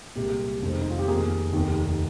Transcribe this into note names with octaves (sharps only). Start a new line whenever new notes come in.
C2 A#2 G#3 G4
F1 F2 D#3 G#3 C4
D#4
F4
G4
F2 D#3 A#3 G#4
F1 D#2 D#3